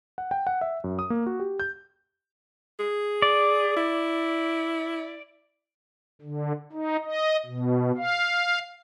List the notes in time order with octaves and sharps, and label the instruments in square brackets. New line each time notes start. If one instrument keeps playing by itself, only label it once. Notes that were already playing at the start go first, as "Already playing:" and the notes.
[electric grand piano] F#5
G5
F#5
E5
F#2
D#6
A#3
F#4
G4
G6
[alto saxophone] G#4
[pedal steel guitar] D5
[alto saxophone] E4
[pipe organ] D3
D#4
D#5
B2
F5